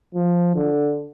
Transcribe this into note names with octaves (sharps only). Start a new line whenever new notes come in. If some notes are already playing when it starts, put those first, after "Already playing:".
F3
D3